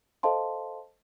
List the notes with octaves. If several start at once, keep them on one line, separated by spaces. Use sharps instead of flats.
A4 C5 D#5 F5 A5 C6